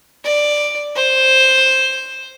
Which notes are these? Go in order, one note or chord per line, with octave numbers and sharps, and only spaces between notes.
D5
C5